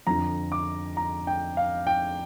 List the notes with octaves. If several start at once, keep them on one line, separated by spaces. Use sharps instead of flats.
F2 D3 F3 A#5
D6
A#5
G5
F5
G5